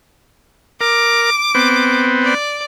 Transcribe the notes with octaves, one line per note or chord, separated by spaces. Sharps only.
A#4 D6
B3 C4
D5